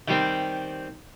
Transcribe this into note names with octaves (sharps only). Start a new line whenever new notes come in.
D#3 G3 C4